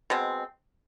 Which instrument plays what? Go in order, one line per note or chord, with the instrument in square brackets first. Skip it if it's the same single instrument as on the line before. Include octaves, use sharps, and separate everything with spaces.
[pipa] B2 G#3 C4